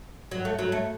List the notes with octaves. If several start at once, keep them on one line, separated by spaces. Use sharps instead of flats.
F#3
A3
F#3
A3